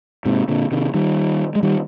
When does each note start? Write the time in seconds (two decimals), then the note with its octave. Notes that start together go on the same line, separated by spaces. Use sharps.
0.25 G#2 C3
0.48 A#2 D3
0.71 C3 D#3
0.94 D#3 G3
1.55 G#3
1.63 D#3 G3